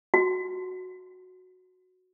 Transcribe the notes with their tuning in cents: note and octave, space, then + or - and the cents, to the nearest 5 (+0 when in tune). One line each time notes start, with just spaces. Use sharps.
F#4 -5